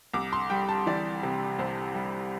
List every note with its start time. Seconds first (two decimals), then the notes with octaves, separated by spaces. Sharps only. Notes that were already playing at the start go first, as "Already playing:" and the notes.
0.14 C2 D6
0.33 C6
0.50 G3 G5
0.69 A5
0.86 E3 D5
1.23 C3
1.59 C2 C5
1.95 G3